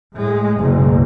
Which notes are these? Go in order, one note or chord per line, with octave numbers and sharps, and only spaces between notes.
A2 G#3
F#1 B1